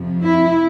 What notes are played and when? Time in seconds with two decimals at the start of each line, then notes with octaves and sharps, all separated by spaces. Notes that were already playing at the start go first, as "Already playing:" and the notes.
Already playing: F2 C3 F3
0.22 E4